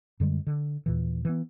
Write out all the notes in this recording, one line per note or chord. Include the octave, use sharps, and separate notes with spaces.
F#2 D3 G3 G#3
D3
D#2 A#2 E3
E3 B3